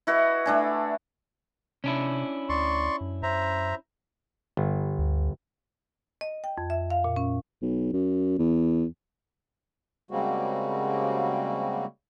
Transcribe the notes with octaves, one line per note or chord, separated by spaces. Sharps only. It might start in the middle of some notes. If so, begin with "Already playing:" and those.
E4 F#4 B4 D#5
A3 D4 G#5
C3 C#4 D4 E4
D2 D5 C6 C#6
F#2
F#2 C5 E5 A#5
G1
D2
D#5
G5
F2
E5
F5
A#2
C#4
B1
F#2
E2
C#3 G3 G#3 A#3 C4 F#4